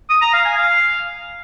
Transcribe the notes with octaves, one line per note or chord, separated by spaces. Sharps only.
D#6
A#5
F5
G#5
F5